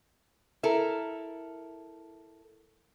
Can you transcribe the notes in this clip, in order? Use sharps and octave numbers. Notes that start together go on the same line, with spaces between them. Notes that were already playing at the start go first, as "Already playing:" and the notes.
E4 A4 A#4